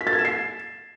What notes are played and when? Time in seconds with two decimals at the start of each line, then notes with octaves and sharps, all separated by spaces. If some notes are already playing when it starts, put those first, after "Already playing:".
0.01 B6
0.07 A6
0.13 G#6
0.19 E7
0.25 C7